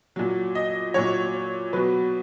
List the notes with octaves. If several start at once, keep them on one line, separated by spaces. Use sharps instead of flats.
A#2 F#3
D#5
A#2 F#3 C#5
B2 F#3 B4